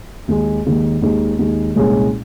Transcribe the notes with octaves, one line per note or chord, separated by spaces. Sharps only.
D#2 D#3 G#3
D#2 D#3 G#3
D#2 D#3 G#3
D#2 D#3 G#3
C2 A#2 G#3 C#4